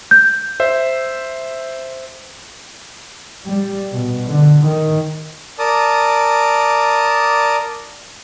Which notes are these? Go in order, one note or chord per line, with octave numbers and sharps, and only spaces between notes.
G6
C5 E5
G3
B2
D3
D#3
A#4 D5 A5 D#6